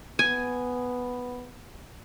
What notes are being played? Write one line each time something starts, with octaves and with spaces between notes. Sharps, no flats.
B3 G#5